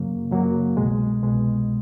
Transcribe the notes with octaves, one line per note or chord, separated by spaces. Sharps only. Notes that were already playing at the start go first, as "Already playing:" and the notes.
Already playing: F#2 C#3 F#3 A#3
F#2 C#3 F#3 A#3
C2 B2 G#3
C2 B2 G#3